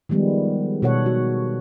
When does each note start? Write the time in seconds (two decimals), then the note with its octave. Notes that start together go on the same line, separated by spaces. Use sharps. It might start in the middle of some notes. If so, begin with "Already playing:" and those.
0.09 D#3 F3 G3 G#3 B3
0.82 B2 A4 C#5 F#5
1.06 F#4